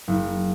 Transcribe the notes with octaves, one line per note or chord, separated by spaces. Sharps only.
F#1